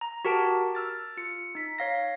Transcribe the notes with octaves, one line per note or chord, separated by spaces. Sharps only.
A#5
F#4 G4 A#4 A5 D7
E6 F6 A6
F4 C#7
D#4 B6
C#5 F5 A#6